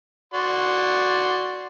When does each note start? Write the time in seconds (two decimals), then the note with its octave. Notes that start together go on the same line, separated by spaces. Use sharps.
0.34 F#4 D5 C6